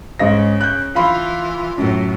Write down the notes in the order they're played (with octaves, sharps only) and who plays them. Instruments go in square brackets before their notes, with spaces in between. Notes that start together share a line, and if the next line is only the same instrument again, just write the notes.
[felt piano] G#2 D#5 A#6 [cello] C#3
[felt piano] F#6 G6
[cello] E3 [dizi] F4 [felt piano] F5 B5 C6
[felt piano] F#2 [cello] A2 F#3